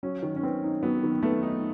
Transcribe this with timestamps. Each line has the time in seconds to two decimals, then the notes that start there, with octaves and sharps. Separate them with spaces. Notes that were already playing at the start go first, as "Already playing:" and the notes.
0.03 F#3 C#4
0.23 D#3
0.36 C#4
0.43 B3 C4
0.64 D#4
0.83 F#3 B3
1.03 D#3
1.23 A3 B3
1.43 D#4